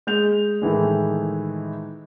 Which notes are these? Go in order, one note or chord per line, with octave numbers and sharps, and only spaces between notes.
G#3 G6 F7
A2 D#3 E3 G#3